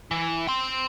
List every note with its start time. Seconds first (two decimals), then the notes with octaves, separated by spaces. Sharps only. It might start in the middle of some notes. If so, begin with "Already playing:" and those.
0.11 E3
0.47 G5 C6